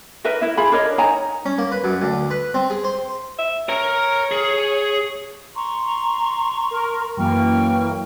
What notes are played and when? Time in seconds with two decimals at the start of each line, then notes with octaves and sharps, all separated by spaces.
0.24 D#4 A#4 B4 E5
0.41 E4 E5
0.57 F4 G#4 B5
0.72 D4 A#4 C#5 D#5
0.98 D#4 C#5 G#5 A#5
1.46 C#4
1.58 A#3
1.72 B4
1.84 F#2
2.02 D2
2.30 B4
2.54 C4
2.70 G#4
2.84 C5
3.39 E5
3.69 A#4 C#5 A#5
4.31 G#4
5.56 A#5 C6 C#6
6.71 A#4
7.17 F#2 E3 A#3 G5 C#6 F6